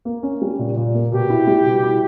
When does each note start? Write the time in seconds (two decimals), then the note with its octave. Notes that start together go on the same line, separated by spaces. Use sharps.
0.05 A#3
0.23 C#4
0.42 G3
0.59 A#2
0.76 A#2
0.94 A#3
1.12 B2 G4
1.30 E4
1.47 G3
1.65 B2
1.83 E4